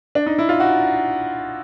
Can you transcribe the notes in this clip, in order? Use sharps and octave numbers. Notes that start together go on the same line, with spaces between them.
D4
D#4
E4
F4
F#4